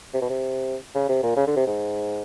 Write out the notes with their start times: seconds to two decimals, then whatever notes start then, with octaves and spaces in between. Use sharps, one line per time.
0.14 C3
0.22 B2
0.30 C3
0.95 C#3
1.09 C3
1.23 A#2
1.36 C#3
1.47 D3
1.57 C3
1.67 G#2